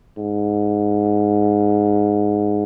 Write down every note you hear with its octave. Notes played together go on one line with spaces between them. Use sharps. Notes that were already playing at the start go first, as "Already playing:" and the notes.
G#2